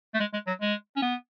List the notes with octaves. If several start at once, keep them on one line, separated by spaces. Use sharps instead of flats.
A3
G#3
G#3
F#3
G#3
C#4
B3